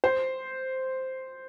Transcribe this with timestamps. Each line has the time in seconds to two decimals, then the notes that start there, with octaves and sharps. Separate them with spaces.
0.04 C5